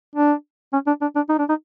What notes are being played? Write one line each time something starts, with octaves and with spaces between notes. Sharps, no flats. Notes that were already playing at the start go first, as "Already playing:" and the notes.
D4
C#4
D4
D4
D4
D#4
D4
D#4